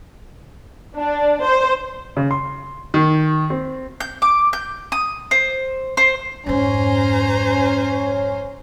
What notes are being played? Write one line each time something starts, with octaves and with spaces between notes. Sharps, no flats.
D4
C5
C#3
C6
D#3
C4
G6
D6
G6
D#6
C5
C5
F2 G#2 C#4 C5 G#5 A#5